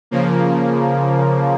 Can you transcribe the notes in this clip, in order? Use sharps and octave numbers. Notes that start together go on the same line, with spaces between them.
C#3 F3 A#3